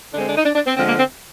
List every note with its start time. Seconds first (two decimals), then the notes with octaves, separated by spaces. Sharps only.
0.13 D3 D4
0.16 G#3
0.21 C4
0.29 D4
0.37 D#4
0.45 D4
0.55 D4
0.67 C4
0.77 D3 F3 G#3 C4
0.88 A#3
0.99 C4